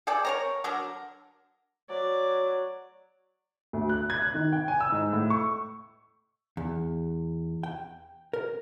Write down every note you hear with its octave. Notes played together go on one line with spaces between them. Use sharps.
G#4 A4 D5 G5
A#4 C#5 A#5
D3 F#3 D4 A#4
F#3 D5
D2
F#6
G#6
F#6
D#3
G5
G#5
E6
G#2
A2
C#6
E2
G5
A#4